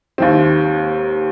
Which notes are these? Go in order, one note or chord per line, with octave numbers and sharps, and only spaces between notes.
D#2 D#3 C4